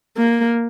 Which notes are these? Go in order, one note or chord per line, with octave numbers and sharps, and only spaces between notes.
A#3